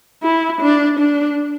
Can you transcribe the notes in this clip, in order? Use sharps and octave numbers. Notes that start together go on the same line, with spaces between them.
E4
D4
D4